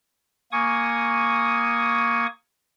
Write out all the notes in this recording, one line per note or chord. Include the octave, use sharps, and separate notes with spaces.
A#3 G#5 C#6 D#6